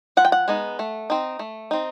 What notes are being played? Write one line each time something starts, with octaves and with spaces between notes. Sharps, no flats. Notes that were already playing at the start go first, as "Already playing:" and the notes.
F3 F#5
G5
F#5
G#3 B3 D#4
A3
C4 D#4
A3
C4 D#4